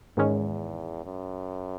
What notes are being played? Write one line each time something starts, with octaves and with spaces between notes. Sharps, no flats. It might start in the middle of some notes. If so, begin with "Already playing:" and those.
E2 G#2 D#3 G#3 C#4
F#2